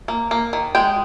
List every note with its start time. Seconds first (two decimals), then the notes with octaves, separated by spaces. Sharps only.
0.08 A#3
0.31 A#3
0.53 D#3
0.75 G#3 G5